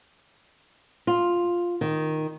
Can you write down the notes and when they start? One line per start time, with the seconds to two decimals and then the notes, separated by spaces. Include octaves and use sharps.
1.07 F4
1.81 D#3